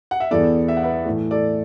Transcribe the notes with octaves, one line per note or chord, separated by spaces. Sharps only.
F#5
E5
E2 E3 B3 A4 D5
E5
F#5
B4 E5
A2 E3 A3
A4 D5